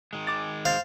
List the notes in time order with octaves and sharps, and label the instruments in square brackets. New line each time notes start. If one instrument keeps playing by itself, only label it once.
[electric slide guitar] D#3 G#3
[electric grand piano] D6 A6
[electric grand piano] C5 A6 [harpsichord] F5